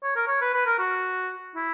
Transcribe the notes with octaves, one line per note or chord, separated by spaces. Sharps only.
C#5
A#4
C#5
B4
B4
A#4
F#4
E4